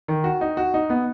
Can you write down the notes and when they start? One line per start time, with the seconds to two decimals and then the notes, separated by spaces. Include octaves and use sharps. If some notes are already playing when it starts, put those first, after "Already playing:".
0.08 D#3
0.24 F#4
0.41 D#4
0.57 F#4
0.74 D#4
0.90 B3